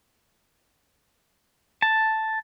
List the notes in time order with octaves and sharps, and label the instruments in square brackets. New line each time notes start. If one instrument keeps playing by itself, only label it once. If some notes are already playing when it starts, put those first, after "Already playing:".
[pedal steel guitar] A5